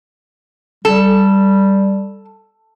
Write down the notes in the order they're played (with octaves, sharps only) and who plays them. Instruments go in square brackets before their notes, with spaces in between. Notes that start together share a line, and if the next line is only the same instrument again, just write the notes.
[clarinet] G3 [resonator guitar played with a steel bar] A4